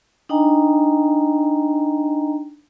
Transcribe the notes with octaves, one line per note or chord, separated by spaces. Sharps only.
D4 D#4 D#5 G5 G#5 A#5